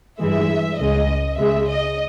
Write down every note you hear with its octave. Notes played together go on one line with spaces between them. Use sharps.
G2 E3 G#3 E5
C#2 C#3 G#3 D#5
C#2 C#3 G#3 E5
D#5